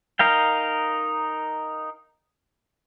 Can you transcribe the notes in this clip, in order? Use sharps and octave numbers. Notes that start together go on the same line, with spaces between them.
D#4 A#4 F5 G5